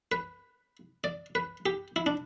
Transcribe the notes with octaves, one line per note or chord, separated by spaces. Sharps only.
B4
D5
B4
G4
E4
D4